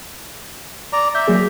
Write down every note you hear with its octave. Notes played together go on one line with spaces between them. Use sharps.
D5 A#5
E5 G6
F#3 A#3 G#4